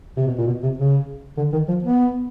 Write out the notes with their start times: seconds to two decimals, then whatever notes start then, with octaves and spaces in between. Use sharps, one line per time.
0.17 C3
0.27 B2
0.38 A#2
0.47 B2
0.63 C3
0.78 C#3
1.37 D3
1.53 D#3
1.68 F3
1.83 B3